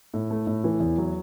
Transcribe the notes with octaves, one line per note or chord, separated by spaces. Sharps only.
A2
A3
A2
E3
E2
F#3